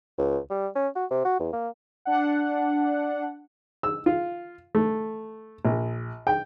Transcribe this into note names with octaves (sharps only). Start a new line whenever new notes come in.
C#2
G3
C#4
F#4
C3
F#4
E2
A#3
D4 F#5
E6
F4
A3
A#1
G5